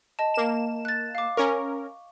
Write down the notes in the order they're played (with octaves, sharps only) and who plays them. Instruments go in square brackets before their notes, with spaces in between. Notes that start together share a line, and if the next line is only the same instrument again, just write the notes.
[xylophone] D#5 A5
[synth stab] A#3 E7
[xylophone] F#6 A6
F5 D6
[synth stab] C#4 A#4 [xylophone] C#6